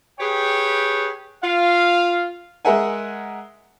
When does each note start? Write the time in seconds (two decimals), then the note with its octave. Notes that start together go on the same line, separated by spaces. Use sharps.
0.19 G4 G#4 B4 C#5 G5
1.42 F4 F5
2.65 G#3 G#4 A#4 E5 F#5 G#5